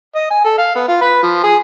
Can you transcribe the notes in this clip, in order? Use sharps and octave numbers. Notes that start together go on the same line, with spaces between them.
D#5
G#5
A4
F5
B3
F4
B4
F3
G#4